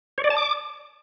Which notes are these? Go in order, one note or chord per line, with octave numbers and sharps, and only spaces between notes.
C#5
D5
A5
D6